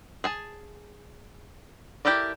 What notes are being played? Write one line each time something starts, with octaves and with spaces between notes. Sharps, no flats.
G#4 G#5 A5
E4 G4 A4 A#4 D5